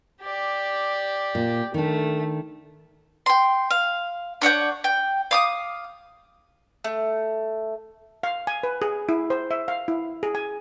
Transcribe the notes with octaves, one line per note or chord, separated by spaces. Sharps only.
G4 D5
A#2
D#3 A3 D4
G5 C6
F5
D4 C#5 F#5 G6
G5
F5 D6 D#6
A3
F5
G#5
B4
G#4
E4
C5
E5
F5
E4
G#4
G#5